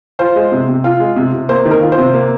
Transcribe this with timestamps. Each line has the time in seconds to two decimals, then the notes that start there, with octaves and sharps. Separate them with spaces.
0.19 F4 C5
0.36 G#3
0.52 C3
0.69 C3
0.84 F4
1.00 G#3
1.16 C3
1.33 C3
1.49 A#3 C5
1.65 D#3
1.71 A#4
1.81 F4
1.92 C5
1.98 C3
2.14 A#3